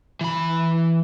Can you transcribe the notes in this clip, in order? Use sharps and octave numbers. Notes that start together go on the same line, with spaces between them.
E3 B5